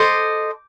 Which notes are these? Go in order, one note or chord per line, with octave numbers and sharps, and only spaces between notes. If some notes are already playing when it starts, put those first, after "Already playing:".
Already playing: A4 C5 D#5 D6